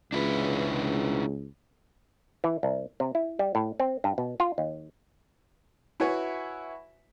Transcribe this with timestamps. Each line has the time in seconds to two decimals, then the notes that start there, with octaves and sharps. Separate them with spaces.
0.12 C#2 D4 E4 B4
2.44 E3
2.63 C2
3.00 C3
3.15 E4
3.39 G3
3.55 A2
3.80 C4
4.04 G2
4.18 B2
4.40 F4
4.58 D#2
6.00 E4 F#4 B4 C#5 E5 G#5